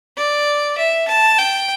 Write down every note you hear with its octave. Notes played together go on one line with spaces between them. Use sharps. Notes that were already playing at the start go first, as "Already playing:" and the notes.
D5
E5
A5
G5